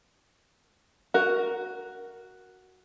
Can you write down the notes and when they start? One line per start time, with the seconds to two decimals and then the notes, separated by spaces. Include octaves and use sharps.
1.14 F#4 A#4